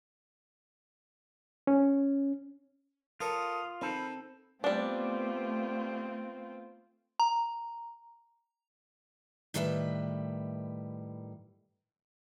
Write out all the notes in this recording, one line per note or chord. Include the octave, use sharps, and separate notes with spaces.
C#4
F4 A4 A#4 C#5 D#6
D#3 C4 A4 B5
G3 A3 B3 C4 D4 F4
A#5
A2 D#3 G3 B4 C5 E5